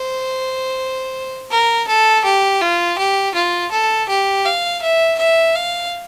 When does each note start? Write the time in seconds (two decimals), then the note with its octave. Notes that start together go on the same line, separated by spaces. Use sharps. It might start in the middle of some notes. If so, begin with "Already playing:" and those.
Already playing: C5
1.51 A#4
1.87 A4
2.24 G4
2.61 F4
2.98 G4
3.35 F4
3.71 A4
4.08 G4
4.45 F5
4.82 E5
5.18 E5
5.55 F5